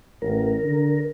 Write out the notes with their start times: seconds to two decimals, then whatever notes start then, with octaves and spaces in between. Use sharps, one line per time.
0.22 A1 A#4
0.64 D3